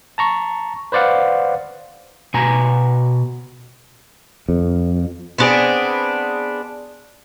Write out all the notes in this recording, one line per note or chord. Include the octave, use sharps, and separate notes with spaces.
A5 A#5 C#6
B4 C5 D5 F5 F#5
B2 G#5 A#5
F2
B3 C4 D4 G#4